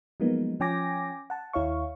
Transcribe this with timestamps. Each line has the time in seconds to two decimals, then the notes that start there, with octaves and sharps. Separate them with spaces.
0.20 F3 F#3 G#3 A#3 B3 D#4
0.60 F3 C#4 G5 G#5 D6 A#6
1.30 F#5 A5
1.53 D#2 E4 C#5 F5 C#6